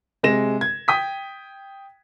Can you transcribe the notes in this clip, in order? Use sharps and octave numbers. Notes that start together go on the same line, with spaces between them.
C3 G#3 A#6 E7
G#6
G5 D#6 B6